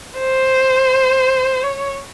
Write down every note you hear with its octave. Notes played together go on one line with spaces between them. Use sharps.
C5
C#5